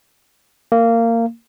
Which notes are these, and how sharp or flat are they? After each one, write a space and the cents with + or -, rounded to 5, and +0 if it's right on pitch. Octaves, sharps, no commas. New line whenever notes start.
A#3 -20